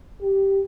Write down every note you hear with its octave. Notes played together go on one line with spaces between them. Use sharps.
G4